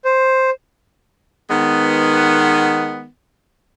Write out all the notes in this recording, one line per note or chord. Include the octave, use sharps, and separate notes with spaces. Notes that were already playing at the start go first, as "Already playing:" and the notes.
C5
D#3 G#3 B3